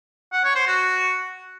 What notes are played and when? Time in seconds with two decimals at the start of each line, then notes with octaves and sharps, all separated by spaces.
0.33 F#5
0.44 C#5
0.55 C5
0.67 F#4